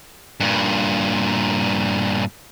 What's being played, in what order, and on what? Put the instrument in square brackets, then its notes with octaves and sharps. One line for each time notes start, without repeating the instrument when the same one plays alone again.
[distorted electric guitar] G2 A#2